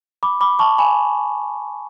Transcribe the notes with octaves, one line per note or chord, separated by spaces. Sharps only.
B5 D6
B5 D6
A5 C#6
G#5 B5